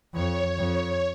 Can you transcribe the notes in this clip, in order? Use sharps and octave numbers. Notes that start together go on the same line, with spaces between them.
F2 C#5
F2